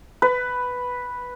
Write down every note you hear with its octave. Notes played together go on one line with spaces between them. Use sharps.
B4